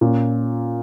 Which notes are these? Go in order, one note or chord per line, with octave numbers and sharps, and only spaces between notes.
A#2 C#4